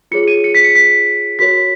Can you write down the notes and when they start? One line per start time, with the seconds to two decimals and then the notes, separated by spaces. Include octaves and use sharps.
0.11 F4 G#4 C#5 C#7
0.28 D#7
0.44 C#7
0.55 B6
0.64 C#7
0.75 B6
1.39 F#4 A#4 C#5 B6